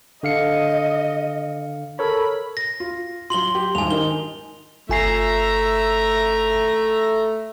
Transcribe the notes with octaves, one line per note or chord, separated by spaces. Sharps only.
D3 D#5 F5 C#7
A4 A#4 C#5 B5
A#6
F4
F#3 F4 C6 F#7 G7
G4
D#1 G#2 G#5 F7
D#3 D#4 G7
G1 A3 E5 G#5 A#5 C7